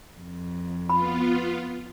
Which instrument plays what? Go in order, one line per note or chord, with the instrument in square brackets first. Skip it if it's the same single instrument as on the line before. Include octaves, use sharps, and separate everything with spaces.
[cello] F2
[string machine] B3 F4 [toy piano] B5